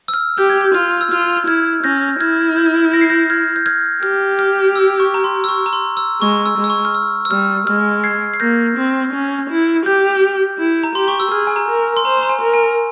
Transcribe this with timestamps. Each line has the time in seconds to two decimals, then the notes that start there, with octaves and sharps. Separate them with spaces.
0.08 E6
0.14 F6
0.38 G4 G6
0.50 G#6
0.61 G6
0.75 F4 F6
1.01 E6
1.12 F4 F6
1.47 E4 F6 G#6
1.83 C#4 G6 A#6
2.20 E4 F6 G#6
2.57 G6
2.94 A#6
3.01 C7
3.10 G6 A#6
3.30 F6 G#6
3.56 G6
3.66 F6 G#6
4.03 G4 F6
4.39 F6
4.76 E6
5.00 C#6
5.14 A#5
5.24 C6
5.44 E6
5.49 C#6
5.66 A#5
5.73 C6
5.97 E6
6.21 G#3 C#6
6.46 E6
6.58 G#3
6.64 E6
6.70 C#6
6.85 F6
6.95 E6
7.25 E6
7.31 G3 F6
7.67 G#3 F6
8.04 G#6 C7
8.34 C7
8.40 A#3 G6 A#6
8.77 C4
9.13 C#4
9.50 E4
9.86 G4 G6
10.59 E4
10.84 A#5
10.95 G4 C6
11.08 C#6
11.20 E6
11.31 G#4 F6
11.47 G#5
11.56 A#5
11.69 A#4
11.97 C6
12.05 C5 A#5
12.23 A#5
12.29 G#5
12.41 A#4
12.54 G#5